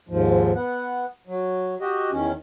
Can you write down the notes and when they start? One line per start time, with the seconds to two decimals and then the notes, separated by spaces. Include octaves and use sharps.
0.09 D#2 G#2 F3
0.55 B3 F#5
1.27 F#3
1.81 F#4 G4 D#5
2.11 E2 D#3 C#4